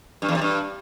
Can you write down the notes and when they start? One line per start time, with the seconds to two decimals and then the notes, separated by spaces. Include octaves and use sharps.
0.22 G2
0.28 E2
0.35 C3
0.41 G2